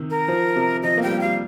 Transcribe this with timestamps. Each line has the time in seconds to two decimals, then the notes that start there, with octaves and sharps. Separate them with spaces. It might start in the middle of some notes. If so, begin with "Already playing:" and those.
Already playing: C3 D#3
0.10 A#4
0.28 F3
0.56 C3
0.83 F3 D#5
0.97 A#3
1.03 G3 G5
1.12 A#3
1.21 G3 F5